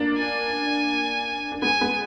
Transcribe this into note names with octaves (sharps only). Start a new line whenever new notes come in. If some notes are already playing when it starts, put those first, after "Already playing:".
Already playing: A#3 D4
G#5
D4
G#3 B3 G#5
G#3 B3